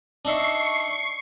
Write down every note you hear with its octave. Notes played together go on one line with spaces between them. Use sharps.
D4 D#4 E5 C#6 C7